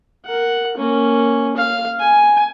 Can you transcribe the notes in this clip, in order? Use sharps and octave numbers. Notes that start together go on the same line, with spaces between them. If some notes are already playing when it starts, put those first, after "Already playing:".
A#4 F#5
A#3 C#4
F5
G#5